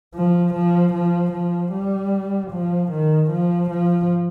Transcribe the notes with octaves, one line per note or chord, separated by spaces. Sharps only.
F3
F3
F3
F3
G3
F3
D#3
F3
F3